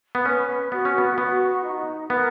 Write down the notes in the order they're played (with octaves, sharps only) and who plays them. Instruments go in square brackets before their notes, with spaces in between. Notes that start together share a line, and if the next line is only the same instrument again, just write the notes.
[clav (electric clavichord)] B3
[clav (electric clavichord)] C#4 [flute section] B4
[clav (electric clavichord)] B3 [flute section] F#4
[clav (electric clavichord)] C#4
B3
[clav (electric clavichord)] B3 [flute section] F#4
[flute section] D#4
[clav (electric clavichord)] B3 [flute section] A#4